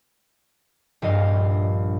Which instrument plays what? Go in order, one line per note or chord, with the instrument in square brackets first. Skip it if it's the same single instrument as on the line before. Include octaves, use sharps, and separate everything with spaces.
[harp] A#1 G2 D#5 F5